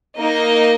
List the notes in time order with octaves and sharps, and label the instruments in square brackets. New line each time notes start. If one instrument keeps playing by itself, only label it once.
[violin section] A#3 D#4 A#4 D#5